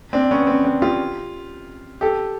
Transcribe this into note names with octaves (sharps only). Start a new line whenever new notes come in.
C4 D4
B3 C#4
C4
C4 D4
F4 G4
G4 A4